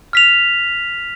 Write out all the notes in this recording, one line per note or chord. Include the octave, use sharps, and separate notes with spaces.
F6 B6 F7